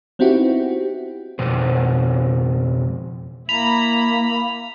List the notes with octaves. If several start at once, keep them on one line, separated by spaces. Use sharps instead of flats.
B3 C4 D#4 E4 F#4 G4
F2 B2 C5
A#3 E4 A#5 B5 F7